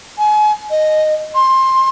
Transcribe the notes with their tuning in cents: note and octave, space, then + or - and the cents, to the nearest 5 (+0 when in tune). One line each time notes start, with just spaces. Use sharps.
G#5 +35
D#5 -10
C6 +15